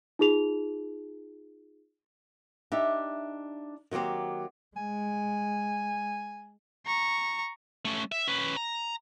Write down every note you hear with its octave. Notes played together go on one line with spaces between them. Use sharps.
D#4 F4 G#4 F7
D4 D#4 G4 E5
D#3 F#3 A#3 C4 G4
G#3 G#5
A#5 C#6
A3 C#4
E5
C#4 B4
A#5